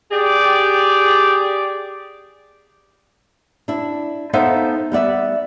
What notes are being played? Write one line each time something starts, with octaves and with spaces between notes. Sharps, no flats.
G4 G#4 D5
D4 E4
B3 D#4 A4 C5 E5 F5
G3 B3 D5 E5